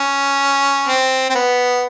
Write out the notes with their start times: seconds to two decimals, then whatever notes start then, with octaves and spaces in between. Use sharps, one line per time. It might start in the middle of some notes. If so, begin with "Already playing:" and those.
Already playing: C#4
0.88 C4
1.30 C4
1.35 B3